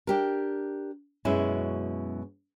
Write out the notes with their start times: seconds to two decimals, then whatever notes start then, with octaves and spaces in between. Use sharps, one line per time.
0.07 D4 G4 A#4
1.25 F#2 B2 G#3 C#4 E4